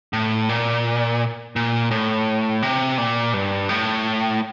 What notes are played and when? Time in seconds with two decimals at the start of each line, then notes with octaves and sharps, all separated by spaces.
0.13 A2
0.49 A#2
1.56 A#2
1.91 A2
2.62 C3
2.98 A#2
3.34 G2
3.69 A2